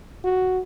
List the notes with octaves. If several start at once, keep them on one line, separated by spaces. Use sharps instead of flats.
F#4